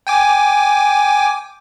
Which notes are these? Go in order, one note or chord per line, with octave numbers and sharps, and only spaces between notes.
G5 G#5 D6